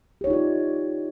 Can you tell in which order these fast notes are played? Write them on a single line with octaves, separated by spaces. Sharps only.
G4 C#5 D#4 F4 D5